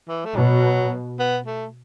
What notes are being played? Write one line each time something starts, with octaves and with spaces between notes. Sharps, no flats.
E3
A3
B2 F#3
B3
A3